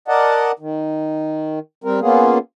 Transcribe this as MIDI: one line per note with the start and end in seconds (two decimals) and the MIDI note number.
0.08 0.52 70
0.08 0.52 74
0.08 0.52 75
0.08 0.52 78
0.08 0.52 81
0.59 1.59 51
1.84 2.00 55
1.84 2.00 60
1.84 2.00 70
2.01 2.38 58
2.01 2.38 59
2.01 2.38 61
2.01 2.38 65
2.01 2.38 68